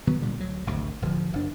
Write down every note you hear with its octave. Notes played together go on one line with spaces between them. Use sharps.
D#3 F#3 B3
A#2 D3 G3
D2 F#3
G#1 D2 C3
D1 D3 E3 F3
F#1 D4